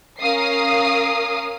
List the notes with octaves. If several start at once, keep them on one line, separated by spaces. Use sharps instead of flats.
C#4 A#4 F5 D#6 C7